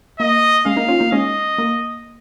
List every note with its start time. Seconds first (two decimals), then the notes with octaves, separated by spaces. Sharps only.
0.20 A#3 D#5
0.65 G#3 C#4 F5
0.77 A#3 D#4
0.88 C#4 F4
1.00 A#3 D#4
1.12 G#3 C#4 D#5
1.58 A#3